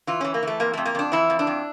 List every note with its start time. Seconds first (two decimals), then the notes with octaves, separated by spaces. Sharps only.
0.07 E3 F4
0.21 E3 C#4
0.34 A#3
0.43 E3 A3
0.60 F2 A#3
0.73 F2 A3
0.85 A#3
0.95 F2 D4
1.12 E3 E4
1.30 F2
1.39 D4
1.47 F2